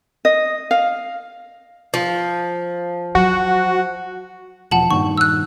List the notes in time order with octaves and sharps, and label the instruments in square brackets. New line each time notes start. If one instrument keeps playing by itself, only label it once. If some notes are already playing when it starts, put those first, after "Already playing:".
[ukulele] D#5
F5
[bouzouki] F3
[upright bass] F#3 [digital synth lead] F#4
[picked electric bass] E1 F3 [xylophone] F#5 A5 F#7
[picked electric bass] G2 A#2 D#3 [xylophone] C#6
[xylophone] E6 F#6